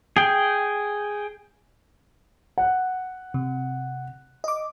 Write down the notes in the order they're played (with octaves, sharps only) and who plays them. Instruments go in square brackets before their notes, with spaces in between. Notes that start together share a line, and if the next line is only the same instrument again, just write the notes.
[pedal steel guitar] G#4 G5
[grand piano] F#5
[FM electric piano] C3
D#5 D6